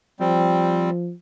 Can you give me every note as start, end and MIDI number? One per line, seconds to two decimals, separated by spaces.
0.20 1.12 53
0.20 0.90 55
0.20 0.90 60